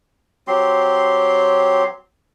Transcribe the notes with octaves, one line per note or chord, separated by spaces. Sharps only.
F#3 C4 G4 C6